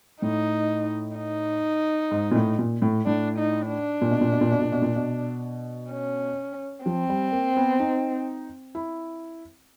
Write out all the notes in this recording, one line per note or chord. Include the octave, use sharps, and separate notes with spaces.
A2 D#4
D#4
G#2
A#2
A2
A#2
A2
A2 D4
D#4
D4
A#2
B2
A#2
B2
A#2
B2
A#2
B2
A#2
B2
C#4
F3 C4
G3
A#3
B3
D#4
E4